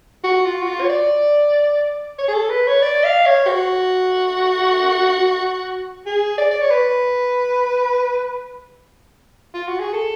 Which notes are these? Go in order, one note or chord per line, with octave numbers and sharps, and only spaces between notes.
F#4
F4
F#4
F4
C#5
D5
C#5
G#4
A4
B4
C#5
D5
F5
C#5
F#4
G#4
D5
D5
C#5
B4
F4
F#4
G#4
A4